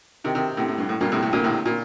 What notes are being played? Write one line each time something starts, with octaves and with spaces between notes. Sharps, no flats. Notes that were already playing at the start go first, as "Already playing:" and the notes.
C3 D#3
C3 D#3
A2 C3
A2
G2
A2
G2 A#2
A2 C3
A2 C3
A#2 D3
A2 C3
A#2